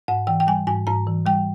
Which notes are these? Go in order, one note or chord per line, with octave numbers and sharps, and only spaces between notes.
G#2 F#5
E3 G5
G5
G3 G#5
G#2 G#5
G#2 A#5
E3
G3 G5